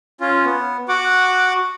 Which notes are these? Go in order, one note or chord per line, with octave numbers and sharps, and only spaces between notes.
C#4 F4
B3
F#4 F#5 D6